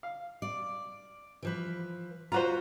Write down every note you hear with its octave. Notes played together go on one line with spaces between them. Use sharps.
F5
D5
E3 F3 B4
F4 F#4 B4 C5 A#5